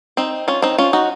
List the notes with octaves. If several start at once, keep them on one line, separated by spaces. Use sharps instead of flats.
C4 D#4
C#4 F4
C4 D#4
C#4 F4
D#4 F#4